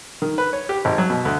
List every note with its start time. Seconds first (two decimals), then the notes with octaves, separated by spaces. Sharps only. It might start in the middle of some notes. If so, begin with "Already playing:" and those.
0.22 D#3
0.38 B4
0.53 C#5
0.69 G4
0.85 G#1
0.98 F#3
1.10 B2
1.25 D2